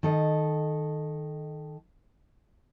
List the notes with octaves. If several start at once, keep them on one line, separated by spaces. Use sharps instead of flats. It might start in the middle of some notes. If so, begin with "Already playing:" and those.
D#3 A4 D#5